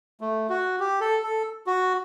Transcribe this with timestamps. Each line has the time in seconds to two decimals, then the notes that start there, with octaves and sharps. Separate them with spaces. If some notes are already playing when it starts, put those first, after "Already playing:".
0.21 A3
0.50 F#4
0.80 G4
1.01 A4
1.23 A4
1.67 F#4